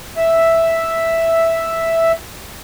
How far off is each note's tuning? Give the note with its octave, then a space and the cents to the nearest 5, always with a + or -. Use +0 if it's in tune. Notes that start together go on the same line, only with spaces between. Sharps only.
E5 +0